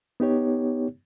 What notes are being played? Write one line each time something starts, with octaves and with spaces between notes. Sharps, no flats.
B3 D#4 G4 C#5